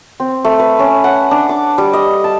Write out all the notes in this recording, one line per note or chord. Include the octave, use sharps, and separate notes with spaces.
C4
A3
B4
C#4
F#5
D4
D6
G3
D#5
A5